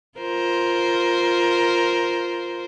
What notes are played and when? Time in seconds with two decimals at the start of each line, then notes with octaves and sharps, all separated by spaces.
0.19 F4 A#4 C5